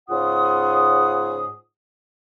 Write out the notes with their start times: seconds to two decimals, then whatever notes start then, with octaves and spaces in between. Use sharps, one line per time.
0.09 G#2 C#3 F4 F#5 D#6